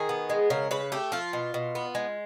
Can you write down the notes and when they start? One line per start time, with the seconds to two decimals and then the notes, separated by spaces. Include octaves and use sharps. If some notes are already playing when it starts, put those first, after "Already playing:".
Already playing: D#3 G#4
0.09 B3
0.30 G#3
0.50 C#3 A#4
0.71 C#3 B4
0.92 A3 G4
1.12 F3 F4
1.33 B2
1.54 B2
1.75 B3
1.95 G#3